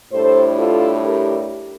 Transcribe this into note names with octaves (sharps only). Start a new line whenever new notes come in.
A2 G3 D4 A4 C5
F4 A4
G4 A#4